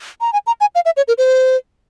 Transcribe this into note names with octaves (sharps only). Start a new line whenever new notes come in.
A#5
G#5
A#5
G#5
F5
E5
C#5
A#4
C5